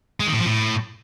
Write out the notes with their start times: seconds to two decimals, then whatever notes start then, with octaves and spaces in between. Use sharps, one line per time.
0.20 G#3
0.27 D#3
0.33 A2
0.40 F3
0.46 A2